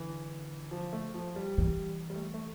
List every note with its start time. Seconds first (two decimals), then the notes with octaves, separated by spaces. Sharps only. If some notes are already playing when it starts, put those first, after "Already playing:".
Already playing: D3 E3
0.71 F3
0.93 A3
1.14 F3
1.36 G3
1.58 E3 G3
2.10 G3
2.15 A3
2.34 A3